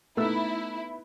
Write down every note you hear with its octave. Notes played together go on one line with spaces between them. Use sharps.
A3 B3 D#4 E4 E6